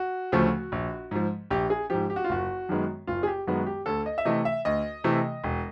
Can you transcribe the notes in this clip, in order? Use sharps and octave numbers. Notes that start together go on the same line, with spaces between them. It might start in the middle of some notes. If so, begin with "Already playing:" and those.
Already playing: F#4
D2 C#3 F3 A3
A#1
G#2 F3
A#1 G4
G#4
G#2 F3 G4
G4
F#4
F4
F#1 F#4
F#2 D#3 G#3 B3
F#1 F4
G#4
G4
F#2 D#3 G#3 B3 F#4
G4
D2 A4
D#5
E5
C3 E3 A3 D#5
E5
D2 D#5
C3 E3 A3
E1